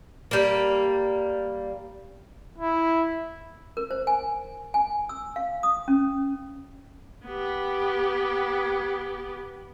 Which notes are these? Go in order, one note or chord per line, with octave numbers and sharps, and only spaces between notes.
G3 A#3
E4
A#4
C5
G#5
G#5
E6
F5
D#6
C#4
B3 G4